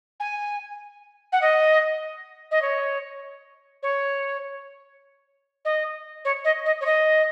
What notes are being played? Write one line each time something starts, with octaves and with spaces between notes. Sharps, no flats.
G#5
F#5
D#5
D#5
C#5
C#5
D#5
C#5
D#5
D#5
C#5
D#5